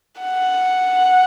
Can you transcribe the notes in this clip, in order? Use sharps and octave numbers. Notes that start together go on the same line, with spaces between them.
F#5